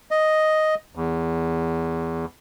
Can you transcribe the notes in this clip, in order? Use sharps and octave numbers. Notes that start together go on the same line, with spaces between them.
D#5
E2